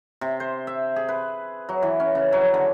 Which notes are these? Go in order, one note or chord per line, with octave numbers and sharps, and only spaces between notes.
C3
C5
E5
G#4
B4
F#3
E3
C#4
C#3
F#3
D3